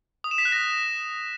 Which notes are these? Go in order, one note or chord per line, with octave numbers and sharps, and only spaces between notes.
D#6
E7
B6
F#6
A#6